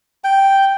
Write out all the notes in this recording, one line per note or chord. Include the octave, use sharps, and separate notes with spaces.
G5